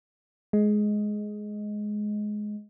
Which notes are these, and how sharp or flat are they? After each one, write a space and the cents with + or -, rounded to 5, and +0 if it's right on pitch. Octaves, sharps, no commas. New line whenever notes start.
G#3 +15 D#5 +10